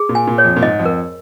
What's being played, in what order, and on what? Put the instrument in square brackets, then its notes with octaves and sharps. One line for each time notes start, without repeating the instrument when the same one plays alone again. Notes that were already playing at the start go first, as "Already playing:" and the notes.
Already playing: [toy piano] G#4
[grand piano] A#2
[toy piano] G#5
[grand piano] A#2
[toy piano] C#5
[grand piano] F2
A#2
[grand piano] G#2 [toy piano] D#5
[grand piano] F2
[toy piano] A#4